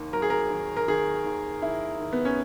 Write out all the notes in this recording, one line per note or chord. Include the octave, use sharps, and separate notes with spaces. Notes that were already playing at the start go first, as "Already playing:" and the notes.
Already playing: D#2 D#3
F#3 A#4
G#4
A#4
D#3
A#4
D#3 G#4
D#2
D#3 E4
D#3
B3
C#4